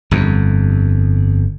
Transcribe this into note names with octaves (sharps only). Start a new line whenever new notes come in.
G1 F2